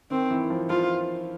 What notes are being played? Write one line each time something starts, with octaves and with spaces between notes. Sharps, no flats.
D#3 C4
E3
F3
F3 F4